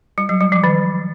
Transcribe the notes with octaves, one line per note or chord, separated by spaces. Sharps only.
G3
F#3
G3
F3
D#3